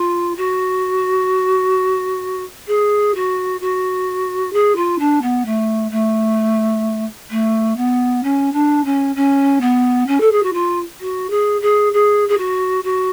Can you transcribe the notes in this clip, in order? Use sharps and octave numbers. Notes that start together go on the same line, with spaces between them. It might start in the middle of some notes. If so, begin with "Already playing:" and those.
Already playing: F4
F#4
G#4
F#4
F#4
G#4
F4
D4
B3
A3
A3
A3
B3
C#4
D4
C#4
C#4
B3
C#4
A4
G#4
F#4
F4
F#4
G#4
G#4
G#4
G#4
F#4
F#4